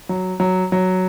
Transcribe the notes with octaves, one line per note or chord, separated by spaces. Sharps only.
F#3
F#3
F#3